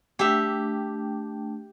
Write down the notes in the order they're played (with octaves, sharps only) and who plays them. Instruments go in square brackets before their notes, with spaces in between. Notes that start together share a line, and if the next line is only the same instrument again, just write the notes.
[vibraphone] A3 D4 G5 [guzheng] G4 E5